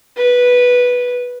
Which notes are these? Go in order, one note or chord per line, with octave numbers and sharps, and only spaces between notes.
B4